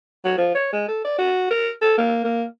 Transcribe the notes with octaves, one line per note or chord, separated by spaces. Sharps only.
F#3
F3
C#5
G#3
A4
D5
F#4
A#4
A4
A#3
A#3